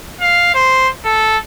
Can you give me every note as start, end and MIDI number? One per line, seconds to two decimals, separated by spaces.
0.21 0.53 77
0.54 0.88 72
1.05 1.37 69